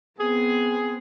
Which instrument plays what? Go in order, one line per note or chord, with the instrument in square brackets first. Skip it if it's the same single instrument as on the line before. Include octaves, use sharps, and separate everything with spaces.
[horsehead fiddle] B3 C4 [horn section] G#4